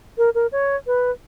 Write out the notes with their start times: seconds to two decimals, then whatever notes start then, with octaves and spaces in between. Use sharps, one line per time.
0.18 A#4
0.35 A#4
0.52 C#5
0.87 B4